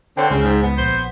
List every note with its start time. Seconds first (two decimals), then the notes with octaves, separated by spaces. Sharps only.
0.17 D3 C4 C5 C#5 G5
0.31 C#2 C#3
0.43 G#2
0.63 B3
0.78 A#1 C5